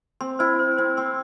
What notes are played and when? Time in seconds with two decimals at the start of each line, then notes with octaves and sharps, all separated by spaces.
0.21 C4 C6
0.39 E4 C5
0.59 C5
0.77 C4 C5
0.97 C4 C6